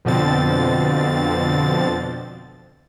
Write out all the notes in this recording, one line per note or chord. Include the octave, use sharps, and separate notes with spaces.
F2 B2 D3 F3 C4 A6